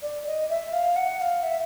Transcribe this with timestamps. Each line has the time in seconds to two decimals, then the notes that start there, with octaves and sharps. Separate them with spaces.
0.02 D5
0.27 D#5
0.50 E5
0.73 F5
0.96 F#5
1.20 F5
1.43 E5